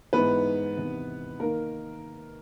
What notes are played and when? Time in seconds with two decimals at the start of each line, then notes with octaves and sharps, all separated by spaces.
0.13 G#2 E3 B3 B4
0.77 E2 C3 D#3
1.40 D#3 A#3 A#4